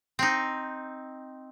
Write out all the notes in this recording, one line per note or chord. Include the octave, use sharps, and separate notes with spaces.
C4 D#4